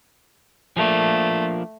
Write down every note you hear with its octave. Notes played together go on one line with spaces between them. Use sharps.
F3 A3 A#3 D4